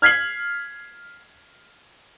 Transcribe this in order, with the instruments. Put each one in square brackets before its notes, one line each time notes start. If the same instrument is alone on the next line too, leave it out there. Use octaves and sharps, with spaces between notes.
[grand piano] F6 G#6 B6 C7 F#7